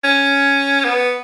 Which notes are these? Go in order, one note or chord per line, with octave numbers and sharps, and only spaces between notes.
C#4
B3